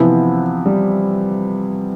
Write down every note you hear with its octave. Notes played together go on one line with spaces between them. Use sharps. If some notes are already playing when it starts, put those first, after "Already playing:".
Already playing: C3 E3 F3 B3 E4
G3